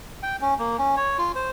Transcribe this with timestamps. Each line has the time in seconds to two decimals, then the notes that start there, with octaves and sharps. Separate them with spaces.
0.23 G5
0.41 C#4
0.59 A#3
0.78 C#4
0.97 C#5
1.18 F4
1.35 C5